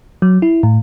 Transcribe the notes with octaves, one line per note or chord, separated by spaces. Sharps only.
F#3
E4
A2